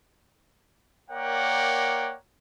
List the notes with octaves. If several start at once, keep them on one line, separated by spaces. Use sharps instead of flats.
A#3 A#4 C#5 D5 F#5 G5